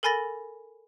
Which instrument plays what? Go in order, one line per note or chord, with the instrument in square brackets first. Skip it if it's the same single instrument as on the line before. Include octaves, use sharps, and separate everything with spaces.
[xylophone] A4 A#4 G#5 B5 A6 A#6